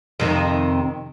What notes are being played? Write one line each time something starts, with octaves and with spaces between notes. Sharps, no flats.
F2 C3 D#3